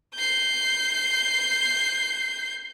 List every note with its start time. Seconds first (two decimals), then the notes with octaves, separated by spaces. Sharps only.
0.15 G6 C7